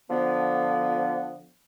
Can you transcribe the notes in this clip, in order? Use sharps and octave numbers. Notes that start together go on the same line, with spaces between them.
D3 F3 B3